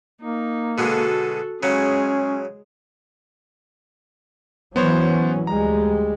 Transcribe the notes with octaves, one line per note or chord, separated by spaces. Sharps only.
A#3 D#4
B2 D3 G#3 F#4 A4
C#3 F#3 G#3 C#4 G#4
E3 F#3 B3 C#4 C5 C#5
D2 G3 G#3 A#5